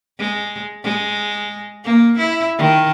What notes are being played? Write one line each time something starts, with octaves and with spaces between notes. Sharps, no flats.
G#3
G#3
A#3
E4
D#3